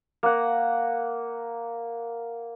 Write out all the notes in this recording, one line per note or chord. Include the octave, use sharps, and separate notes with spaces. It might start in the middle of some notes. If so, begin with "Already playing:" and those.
A#3 F#5